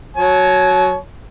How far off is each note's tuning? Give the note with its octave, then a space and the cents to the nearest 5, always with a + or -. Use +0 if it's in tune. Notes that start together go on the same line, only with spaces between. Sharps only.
F#3 +0 C#5 +0 A5 -40